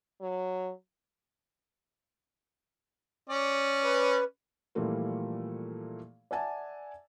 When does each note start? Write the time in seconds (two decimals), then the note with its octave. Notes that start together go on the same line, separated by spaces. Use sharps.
0.21 F#3
3.29 C#4 D5
3.84 B4
4.75 A#2 E3 F3 G3 A3 A#3
6.31 D5 E5 F#5 G#5 A5